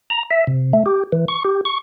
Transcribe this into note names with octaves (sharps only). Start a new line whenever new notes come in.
A#5
E5
C3
A3
G4
E3
C#6
G4
C#6